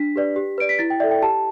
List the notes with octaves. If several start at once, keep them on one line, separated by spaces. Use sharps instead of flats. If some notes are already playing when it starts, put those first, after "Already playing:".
Already playing: D4 B6
G4 B4 D5
G4
B4 D5 D7
B6
E4 A6
G5
A4 D5 E5
G5
G4 A5